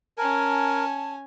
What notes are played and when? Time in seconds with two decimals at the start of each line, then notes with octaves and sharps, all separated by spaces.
0.18 C#4 A#4 G#5 A5